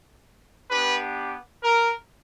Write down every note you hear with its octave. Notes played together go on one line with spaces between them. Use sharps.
B3 D4 G4 B4
A#4